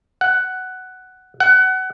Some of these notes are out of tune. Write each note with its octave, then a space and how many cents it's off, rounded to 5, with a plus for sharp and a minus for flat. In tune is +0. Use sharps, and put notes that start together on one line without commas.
F#5 +10
F#5 +25